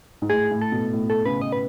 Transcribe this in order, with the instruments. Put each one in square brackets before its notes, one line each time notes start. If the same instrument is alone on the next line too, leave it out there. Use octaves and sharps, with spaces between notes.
[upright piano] G#2
[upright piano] A2 [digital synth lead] G#4
[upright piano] A2
[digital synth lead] A4
[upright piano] B2
A2
[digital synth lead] A4
[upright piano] C#3 [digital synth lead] B4
[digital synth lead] D#5
B4